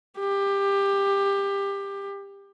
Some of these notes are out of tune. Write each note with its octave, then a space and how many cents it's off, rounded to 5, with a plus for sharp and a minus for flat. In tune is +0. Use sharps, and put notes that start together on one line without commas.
G4 +20